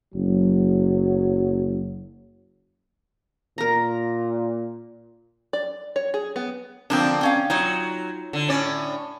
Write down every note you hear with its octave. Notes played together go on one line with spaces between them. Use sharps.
F#1 F#3
A#2 A#4 A#5
D5
C#5
G#4
B3
D3 F3 A#3 C4 D4
C4 C#4 F5
F#3 D#4 F4 C#5
D3
A2 C#4 D5